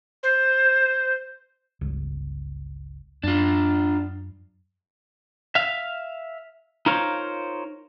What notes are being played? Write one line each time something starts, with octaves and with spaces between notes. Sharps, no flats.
C5
G1 C#2
F#2 D4 F4
E5 F5
D#4 F4 A#4 C5 C#5 F5